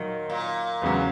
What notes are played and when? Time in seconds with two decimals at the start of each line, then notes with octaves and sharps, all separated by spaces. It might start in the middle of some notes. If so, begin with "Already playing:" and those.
Already playing: A#2 D#3 F#3 A#3
0.30 A#2
0.82 E2 C#3 F#3